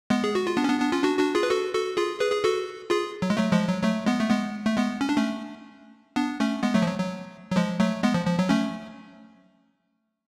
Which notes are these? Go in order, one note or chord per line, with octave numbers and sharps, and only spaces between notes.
G#3 B3
G#4
F#4
F4
B3 D4
C#4
B3 D4
B3 D4
C#4 F4
D4 F#4
D4 F#4
F4 G#4
B4
F#4 A4
F#4 A4
F4 G#4
G#4 B4
G#4
F#4 A4
F4 G#4
F#3
G#3
F#3 A3
F3 G#3
F#3
F#3 A3
G#3 B3
A3
G#3 B3
A3
G#3 B3
C#4
D4
A3 C#4
B3 D4
A3 C#4
G#3 B3
F#3 A3
F3
F#3
F#3
F#3
F3 G#3
F#3 A3
G#3 B3
F3
F3
F#3
A3 C#4